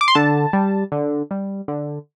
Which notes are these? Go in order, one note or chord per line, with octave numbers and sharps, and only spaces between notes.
D6
C6
D3 A5
G3
D3
G3
D3